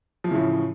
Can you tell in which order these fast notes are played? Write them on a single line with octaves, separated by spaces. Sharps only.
F3 E3 C#3 A2